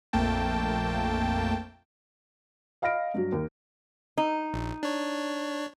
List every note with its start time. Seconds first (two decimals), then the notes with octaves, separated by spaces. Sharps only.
0.13 A#1 F2 A3 A#3 G5 A5
2.82 D#5 F5 B5 F6 A#6 D7
3.14 G2 F#3
3.32 D#2
4.18 D#4
4.54 A#1
4.83 D4 C#5